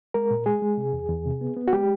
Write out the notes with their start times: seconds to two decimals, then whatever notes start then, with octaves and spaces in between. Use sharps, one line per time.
0.14 G#3 A#4
0.31 A#2
0.46 G#3 G#4
0.62 G#3
0.77 C3
0.93 E2
1.09 E2
1.25 C3
1.41 B3
1.57 B3
1.68 F#4
1.73 G#3 G4